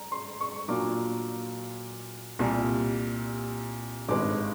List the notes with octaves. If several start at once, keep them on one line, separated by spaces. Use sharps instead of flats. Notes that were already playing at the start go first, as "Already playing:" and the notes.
Already playing: A#5
C6
C#6
A#2 F#3 A#3 D4 F4 D6
C2 A#2 G3
G#1 G2 D#3 G#3 B3 D6